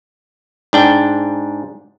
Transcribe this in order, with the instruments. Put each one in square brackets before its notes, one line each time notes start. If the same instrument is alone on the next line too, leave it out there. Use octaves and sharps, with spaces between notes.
[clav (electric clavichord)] G#2 D4 G5